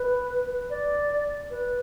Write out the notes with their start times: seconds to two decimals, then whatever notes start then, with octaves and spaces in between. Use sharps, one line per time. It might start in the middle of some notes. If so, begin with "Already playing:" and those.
Already playing: B4
0.70 D5
1.50 B4